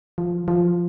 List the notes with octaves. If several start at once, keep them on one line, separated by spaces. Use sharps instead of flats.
F3
F3